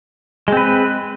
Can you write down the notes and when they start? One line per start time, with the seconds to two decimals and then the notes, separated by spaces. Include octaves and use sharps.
0.48 G#3
0.52 C4
0.57 B4